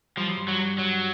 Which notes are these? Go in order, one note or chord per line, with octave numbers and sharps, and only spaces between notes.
F3 G3
F#3
G2 G3
F#3
F#3